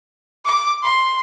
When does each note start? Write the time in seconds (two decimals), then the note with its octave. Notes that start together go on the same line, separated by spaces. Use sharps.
0.45 D6
0.83 C6